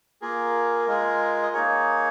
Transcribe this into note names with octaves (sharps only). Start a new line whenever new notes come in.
A#3 F4 G#4 A#4
G#3 F4 G#4
D#5
A#3 D#4 G#4 C#5